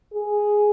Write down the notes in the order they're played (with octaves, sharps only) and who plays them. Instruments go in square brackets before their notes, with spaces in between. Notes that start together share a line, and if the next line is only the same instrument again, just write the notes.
[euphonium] G#4